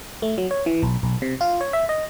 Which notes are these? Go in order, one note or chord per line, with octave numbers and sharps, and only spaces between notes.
A3
F#3
C#5
E3
B1
B1
C3
F4
C#5
E5
D#5